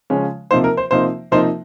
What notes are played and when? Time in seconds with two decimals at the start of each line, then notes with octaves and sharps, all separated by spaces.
0.10 C#3 F3 G#3 C#4
0.51 C3 F3 A#3 D#4 C5
0.64 A#4
0.77 C5
0.91 C3 F3 A#3 D#4 C5
1.31 C3 F3 A#3 D#4 C5